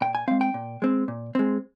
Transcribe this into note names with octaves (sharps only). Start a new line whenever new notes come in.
A#2 G5
G#5
G#3 C4 F5
G5
A#2
G#3 C4
A#2
G#3 C4